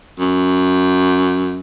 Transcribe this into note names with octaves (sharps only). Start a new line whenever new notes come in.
F#2